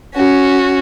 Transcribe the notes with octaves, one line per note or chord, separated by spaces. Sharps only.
C#4 F#4